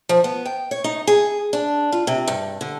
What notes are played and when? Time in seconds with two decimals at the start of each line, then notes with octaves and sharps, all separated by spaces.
0.09 F3
0.24 B3
0.45 G5
0.71 C#5
0.84 D#4
1.07 G#4
1.53 D4
1.92 F4
2.07 C3
2.28 G2
2.61 D3